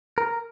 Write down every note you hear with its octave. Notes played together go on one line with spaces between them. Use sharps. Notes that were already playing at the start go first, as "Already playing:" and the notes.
A#4